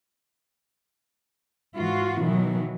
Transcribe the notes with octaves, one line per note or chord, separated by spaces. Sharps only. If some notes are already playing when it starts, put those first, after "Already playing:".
G#2 E3 F4 F#4
B2 D#3 E3 F#3